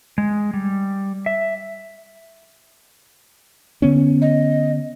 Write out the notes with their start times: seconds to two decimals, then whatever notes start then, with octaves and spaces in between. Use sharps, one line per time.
0.18 G#3
0.54 G3
1.26 E5
3.82 D3 B3 C#4
4.22 D#5